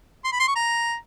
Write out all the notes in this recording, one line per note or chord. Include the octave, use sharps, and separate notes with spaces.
C6
B5
C6
C#6
A#5